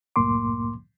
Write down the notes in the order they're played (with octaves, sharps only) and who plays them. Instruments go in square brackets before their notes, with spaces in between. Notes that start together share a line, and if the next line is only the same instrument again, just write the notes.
[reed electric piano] C2 F#2 A2 A#3 C6 D6